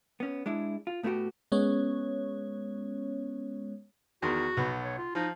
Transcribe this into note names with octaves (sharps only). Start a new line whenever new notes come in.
B3 C#4
G#3 D4 E4
F4
A2 A3 B3 E4 F#4 G4
G#3 B3 C#4 C#5
E2 D#3 F#4 C6
B1 B3
C#5
F4
F3 D#4